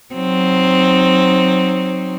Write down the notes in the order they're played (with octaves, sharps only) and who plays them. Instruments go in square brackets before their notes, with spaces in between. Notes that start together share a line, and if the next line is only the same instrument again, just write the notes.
[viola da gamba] F#3 C4 D#4